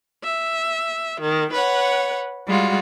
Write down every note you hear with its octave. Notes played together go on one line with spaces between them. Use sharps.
E5
D#3
B4 C#5 F#5
G3 G#3 F4 F#4